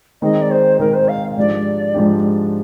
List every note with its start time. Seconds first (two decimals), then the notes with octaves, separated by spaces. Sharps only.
0.22 D#3 G#3 C4 D#4 G#4 D#5
0.42 D5
0.51 C5
0.79 D#3 G#3 C4 D#4 G#4 A#4
0.94 C5
1.08 F5
1.37 G#2 F3 G#3 D4 G4 D5
1.94 G#2 F3 G#3 D4 G4